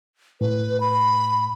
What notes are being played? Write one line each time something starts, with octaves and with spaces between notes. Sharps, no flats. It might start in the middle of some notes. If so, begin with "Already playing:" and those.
A2 B4
B5